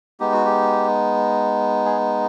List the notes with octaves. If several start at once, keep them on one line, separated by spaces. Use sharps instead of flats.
G#3 B3 D#4 G4
F#4
G4
G#4